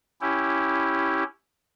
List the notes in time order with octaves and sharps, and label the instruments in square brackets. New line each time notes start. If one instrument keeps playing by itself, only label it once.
[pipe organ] C#4 E4 G4